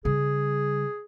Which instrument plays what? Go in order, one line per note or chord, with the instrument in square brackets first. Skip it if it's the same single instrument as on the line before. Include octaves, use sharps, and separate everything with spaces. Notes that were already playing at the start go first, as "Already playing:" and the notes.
[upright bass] C#3 G3 [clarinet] G#4